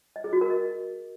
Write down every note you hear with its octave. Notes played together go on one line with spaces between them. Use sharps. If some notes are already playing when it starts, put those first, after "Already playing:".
D#5
G#4
F#4
A#4
D#5